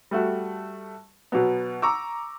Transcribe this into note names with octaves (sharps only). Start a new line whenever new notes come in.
G3 A3 F#4
B2 F#3 B3
A#5 C#6 D6 E6